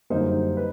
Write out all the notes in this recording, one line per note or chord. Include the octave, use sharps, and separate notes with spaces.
F#2 D3 G3 A#3 D#4 C5
B4